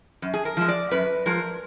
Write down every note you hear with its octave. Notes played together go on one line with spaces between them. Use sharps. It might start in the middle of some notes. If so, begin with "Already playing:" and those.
F#2
G#4
A#4
F3 G#3
D5
F#2 B4
F3 G#3 A#4